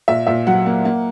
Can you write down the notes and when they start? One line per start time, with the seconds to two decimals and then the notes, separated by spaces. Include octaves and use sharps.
0.08 A#2 E5
0.27 A#2 E5
0.47 F#3 F#5
0.66 A#3
0.85 A#3